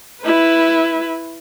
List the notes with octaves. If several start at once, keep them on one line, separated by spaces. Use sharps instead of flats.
E4 B4